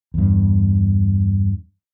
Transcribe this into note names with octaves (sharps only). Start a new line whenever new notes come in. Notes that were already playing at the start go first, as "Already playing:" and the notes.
E2 G2